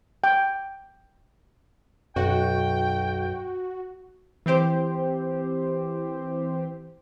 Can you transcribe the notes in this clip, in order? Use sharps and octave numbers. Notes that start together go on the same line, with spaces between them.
G5
B1 F#2 F#4 G5
E3 C4 G4 C5